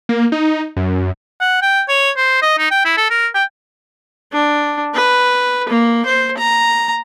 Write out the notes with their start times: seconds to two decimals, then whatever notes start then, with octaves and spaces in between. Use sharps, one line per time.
0.09 A#3
0.32 D#4
0.77 F#2
1.41 F#5
1.62 G5
1.89 C#5
2.17 C5
2.42 D#5
2.59 D#4
2.71 G5
2.85 E4
2.97 A4
3.11 A#4
3.34 G5
4.33 D4
4.94 B4
5.69 A#3
6.06 C5
6.38 A#5